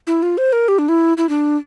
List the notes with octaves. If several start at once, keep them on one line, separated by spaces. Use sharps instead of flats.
E4
F4
C5
A#4
G4
D4
E4
E4
D4